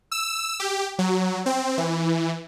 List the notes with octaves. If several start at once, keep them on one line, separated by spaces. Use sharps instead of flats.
E6
G4
F#3
C4
E3